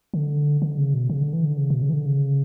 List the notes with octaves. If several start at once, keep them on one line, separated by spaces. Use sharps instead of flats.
D3
D3
C#3
B2
C#3
D3
E3
D3
C#3
B2
C#3
E3
D3
C#3